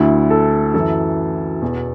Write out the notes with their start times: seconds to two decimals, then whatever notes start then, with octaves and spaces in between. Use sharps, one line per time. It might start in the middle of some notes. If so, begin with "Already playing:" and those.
Already playing: D2 D3 E4
0.30 A4
0.74 F#2 E3 A4
1.62 E2 B2